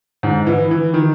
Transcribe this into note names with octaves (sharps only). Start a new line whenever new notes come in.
G#2
E3
E3
D#3